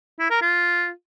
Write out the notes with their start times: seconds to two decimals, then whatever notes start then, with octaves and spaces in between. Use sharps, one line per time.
0.20 E4
0.31 A#4
0.42 F4